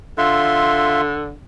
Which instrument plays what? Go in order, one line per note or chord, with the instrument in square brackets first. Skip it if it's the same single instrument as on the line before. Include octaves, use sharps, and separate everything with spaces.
[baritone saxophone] D3 [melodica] F4 E5 C6